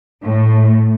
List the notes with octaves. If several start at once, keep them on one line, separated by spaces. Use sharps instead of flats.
A2